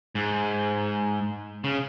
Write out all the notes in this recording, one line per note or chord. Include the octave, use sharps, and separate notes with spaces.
G#2
C#3